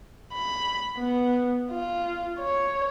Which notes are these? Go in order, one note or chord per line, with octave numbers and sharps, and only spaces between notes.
B5
B3
F4
C#5